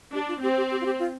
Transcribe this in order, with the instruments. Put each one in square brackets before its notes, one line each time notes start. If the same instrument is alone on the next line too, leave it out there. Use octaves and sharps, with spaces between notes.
[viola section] D4 [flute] G4
[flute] F4
[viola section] C4 [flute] G4
[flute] G4
G4
F4
G4
F4